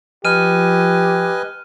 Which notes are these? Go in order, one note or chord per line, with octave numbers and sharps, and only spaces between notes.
F3 G4 B4 D#5 G#5 F6 D#7